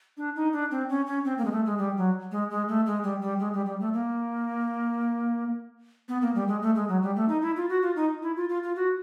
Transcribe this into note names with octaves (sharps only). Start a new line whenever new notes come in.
D4
D#4
D4
C4
C#4
C#4
C4
A#3
G#3
A3
G#3
G3
F#3
G#3
G#3
A3
G#3
G3
G3
G#3
G3
G3
A3
A#3
B3
A#3
G3
G#3
A3
G#3
F#3
G3
A3
D#4
E4
F4
F#4
F4
D#4
E4
F4
F4
F4
F#4